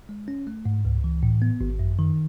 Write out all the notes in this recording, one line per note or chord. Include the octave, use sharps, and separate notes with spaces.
G#3
C#4
A3
G#2
C#2
E3
A2
B3
G#1
F#2
D#3